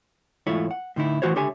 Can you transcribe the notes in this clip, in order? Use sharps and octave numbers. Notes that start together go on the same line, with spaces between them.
E2 G#2 A3 E4 F4 C#5
F#5
A2 D3 D#4 E4
A2 E3 D#4 F#4 C5 C#5
C#2 D3 G4 C#5 E5 G#5